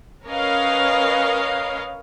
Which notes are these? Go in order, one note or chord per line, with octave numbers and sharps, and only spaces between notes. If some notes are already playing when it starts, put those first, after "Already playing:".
C#4 A#4 B4 C#5 D#5 F5